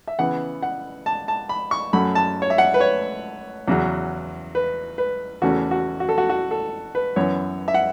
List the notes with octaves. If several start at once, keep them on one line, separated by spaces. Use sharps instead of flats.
E5
C#3 E3 B3 F#5
F#5
A5
A5
B5
C#6
F#2 F#3 A3 C#4 B5
A5
C#5
E5
F#5
B4
C#5
E2 C#3 F#3 C#4
B4
B4
E2 C#3 E3 A3 C#4 F#4
F#4
F#4
A4
F#4
F#4
A4
B4
F#2 E3 B3 C#5
E5
F#5